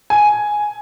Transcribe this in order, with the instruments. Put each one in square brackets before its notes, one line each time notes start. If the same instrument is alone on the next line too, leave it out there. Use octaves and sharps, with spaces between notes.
[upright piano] G#5